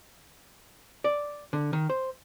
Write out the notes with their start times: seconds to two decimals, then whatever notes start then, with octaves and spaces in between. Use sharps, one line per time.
1.04 D5
1.53 D3
1.73 D#3
1.90 C5